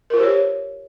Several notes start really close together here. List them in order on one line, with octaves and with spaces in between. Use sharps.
A#4 F4 C5 G4 C#5